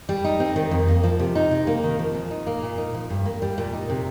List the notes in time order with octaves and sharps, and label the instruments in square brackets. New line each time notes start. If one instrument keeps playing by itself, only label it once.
[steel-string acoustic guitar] G3
D#4
C4
D#3
F2
A#3
F3
C3
D#4
C3
A#3
D#3
F3
A#2
D#4
A#3
A#2
D#4
F3
G2
A#3
G3
A#2
D#4
C3